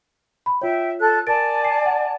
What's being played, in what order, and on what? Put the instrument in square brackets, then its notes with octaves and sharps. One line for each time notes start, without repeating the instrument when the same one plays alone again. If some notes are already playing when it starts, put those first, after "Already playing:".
[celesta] B5
[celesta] F4 C#5 [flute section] E5 G5
[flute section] A4 F#6
[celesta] A#4 A6 D7 [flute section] D5 G#5 A5
[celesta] C7
F#5